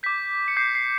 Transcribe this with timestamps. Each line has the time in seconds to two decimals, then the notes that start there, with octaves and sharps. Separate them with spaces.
0.03 D6 G6 B6
0.48 C#7
0.57 D6 G6 C7
0.75 C7